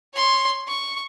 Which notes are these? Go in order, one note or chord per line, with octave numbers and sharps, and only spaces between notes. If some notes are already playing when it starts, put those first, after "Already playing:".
C#5 C6
C#6